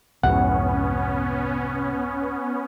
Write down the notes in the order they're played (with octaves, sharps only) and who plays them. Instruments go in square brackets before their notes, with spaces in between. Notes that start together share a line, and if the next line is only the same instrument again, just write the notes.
[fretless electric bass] C2 F2 G#2 [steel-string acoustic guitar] C3 [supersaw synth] B3 C#4 [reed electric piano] F#5